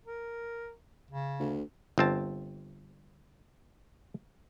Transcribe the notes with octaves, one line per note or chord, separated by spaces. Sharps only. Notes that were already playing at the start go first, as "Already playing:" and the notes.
A#4
C#3
D2
G1 C4 A5